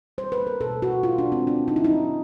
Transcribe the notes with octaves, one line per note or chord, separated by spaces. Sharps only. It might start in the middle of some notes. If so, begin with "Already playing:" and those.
G3 C5
B4
A#3
A#4
B2 A4
B2 F#4
F3 F4
D4
G#3
C4
D3 D4
D3 D#4
E4
D#4
F#3